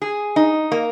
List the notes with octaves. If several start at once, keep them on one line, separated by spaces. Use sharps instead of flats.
G#4
D#4
A#3